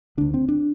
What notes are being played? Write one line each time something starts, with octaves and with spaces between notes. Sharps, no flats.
D2 D3 D4
C4
D4